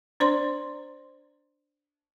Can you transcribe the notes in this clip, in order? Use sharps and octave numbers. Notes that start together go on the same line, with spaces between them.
D4 C5 D5 C6